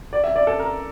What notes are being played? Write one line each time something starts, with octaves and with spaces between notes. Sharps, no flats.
D5
E5
D5
A4
A#4